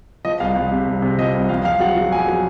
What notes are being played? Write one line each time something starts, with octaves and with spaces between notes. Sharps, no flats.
F3 D#5
C2 F5
C2
C3
C2
C3
F3 D#5
C2
F2 F5
F2 F5
F#3 F#5
F#3
F2 G#5
F#3